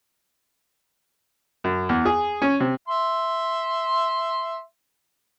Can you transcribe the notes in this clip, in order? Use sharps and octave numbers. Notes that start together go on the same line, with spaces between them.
F#2
E2
G#4
C#4
C3
E5 C6